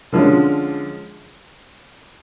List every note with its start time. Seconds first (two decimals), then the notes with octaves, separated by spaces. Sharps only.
0.12 D3 F3 G#3 C#4